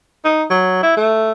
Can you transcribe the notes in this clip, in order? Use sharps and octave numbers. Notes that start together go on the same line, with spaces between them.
D#4
F#3
E4
A3